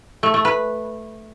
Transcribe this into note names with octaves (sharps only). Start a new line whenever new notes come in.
A3
A3
B4